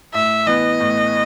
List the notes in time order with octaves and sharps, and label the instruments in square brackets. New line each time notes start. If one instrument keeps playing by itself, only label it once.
[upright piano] A2 [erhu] E5
[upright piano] E3 B3 [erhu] D#5
[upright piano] A2